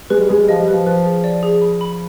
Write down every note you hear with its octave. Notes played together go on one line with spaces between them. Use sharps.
G#3 B4
G3
G#3 G#4
G3
F3 D#5
G3
B4
F3
F3 B4
G#4
D5
G#4
B5
B5